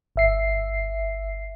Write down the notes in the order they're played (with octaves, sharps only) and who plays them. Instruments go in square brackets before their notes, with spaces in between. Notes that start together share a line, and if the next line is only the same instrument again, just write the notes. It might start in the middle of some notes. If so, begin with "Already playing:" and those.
[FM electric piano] G1 E5 C7